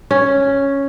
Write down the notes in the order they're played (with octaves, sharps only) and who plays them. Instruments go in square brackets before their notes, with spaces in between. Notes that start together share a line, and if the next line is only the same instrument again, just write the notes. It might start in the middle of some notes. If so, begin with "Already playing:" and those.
[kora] C#4